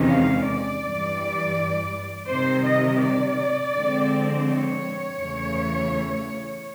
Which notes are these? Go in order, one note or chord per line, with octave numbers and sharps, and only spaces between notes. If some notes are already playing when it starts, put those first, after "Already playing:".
Already playing: E2 C3 D#3 G#3 C#4
F5
D5
G2 E3 G3
C3 D#3 G3 C5
D#5
D5
D3 F3 G#3 C4
C#5
E2 C#3 E3 A3